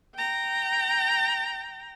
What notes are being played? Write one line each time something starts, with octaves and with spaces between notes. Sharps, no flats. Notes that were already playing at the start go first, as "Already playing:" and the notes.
G5 A#5